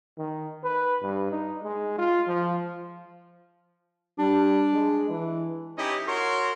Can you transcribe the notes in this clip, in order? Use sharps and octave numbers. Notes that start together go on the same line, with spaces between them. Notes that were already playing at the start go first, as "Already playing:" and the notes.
D#3
B4
G2
D#4
G#3
F4
F3
G3 D4
G#3
E3
C#4 D#4 E4 G4 C#5 D#5
F#4 A#4 C#5 C6